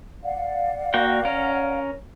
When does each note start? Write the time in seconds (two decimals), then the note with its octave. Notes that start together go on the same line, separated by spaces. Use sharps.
0.24 D5 F5 F#5
0.94 A#3 F#4 G5
1.25 C#4 A#4